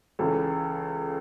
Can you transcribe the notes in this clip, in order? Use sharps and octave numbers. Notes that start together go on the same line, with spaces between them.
C#2 C#3 E3 A4